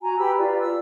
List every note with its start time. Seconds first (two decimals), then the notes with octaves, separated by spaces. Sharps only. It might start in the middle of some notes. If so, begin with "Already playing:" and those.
0.01 F#4 G#5 A#5
0.18 G4 B4 B5 E6
0.38 F4 B4 D5
0.59 E6